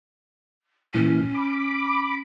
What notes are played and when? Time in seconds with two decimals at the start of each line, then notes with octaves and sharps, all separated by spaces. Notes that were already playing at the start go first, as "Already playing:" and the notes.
0.94 A#2 E3 C#4
1.34 B5 D6